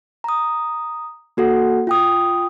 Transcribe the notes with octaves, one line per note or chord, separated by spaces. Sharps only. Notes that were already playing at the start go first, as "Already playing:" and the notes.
A#5 D#6
A#3 F#4 A4 F#5
F4 G5 D#6